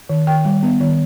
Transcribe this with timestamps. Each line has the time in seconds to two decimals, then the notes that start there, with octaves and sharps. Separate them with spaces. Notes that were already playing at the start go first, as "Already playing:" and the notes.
0.09 D#3
0.27 D#3 G5
0.45 G3
0.63 B3
0.81 D#3